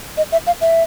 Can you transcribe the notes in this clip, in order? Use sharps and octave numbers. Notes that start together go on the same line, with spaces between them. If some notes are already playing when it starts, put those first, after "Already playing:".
D#5
E5
F5
E5